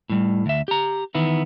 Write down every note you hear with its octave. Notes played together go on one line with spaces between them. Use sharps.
A2 G3
D2 E5
G4 A#5
D#3 E3 B3 E4